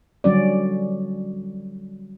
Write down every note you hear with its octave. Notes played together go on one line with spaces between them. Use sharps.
D3 F#3 G3 C#4 F#4 D5